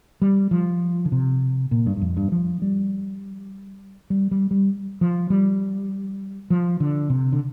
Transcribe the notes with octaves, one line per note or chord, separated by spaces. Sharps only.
G3
F3
D3
C3
A#2
G2
G2
F2
G2
F3
G3
G3
G3
G3
F3
G3
F3
D3
C3
D3